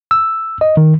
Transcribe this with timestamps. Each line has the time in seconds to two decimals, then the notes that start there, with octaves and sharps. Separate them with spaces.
0.11 E6
0.61 D#5
0.77 D#3